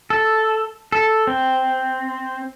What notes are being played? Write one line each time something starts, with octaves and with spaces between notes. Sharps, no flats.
A4
A4
C4